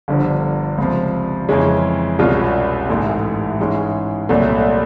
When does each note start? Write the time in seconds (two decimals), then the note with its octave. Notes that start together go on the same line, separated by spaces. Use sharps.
0.08 G1 G2 D3 F3
0.78 C#2 C3 F3
1.49 F2 C#3 E3 G#3 C#4
2.19 C2 B2 G#3 C#4 F4
2.89 A1 G#2 E3 A3
3.59 G#2 E3 G#3 C#4
4.29 C2 A#2 F#3 A3